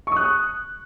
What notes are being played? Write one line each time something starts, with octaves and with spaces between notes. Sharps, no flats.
C#6 D#6 F#6